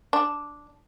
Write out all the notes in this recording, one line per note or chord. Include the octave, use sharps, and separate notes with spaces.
D4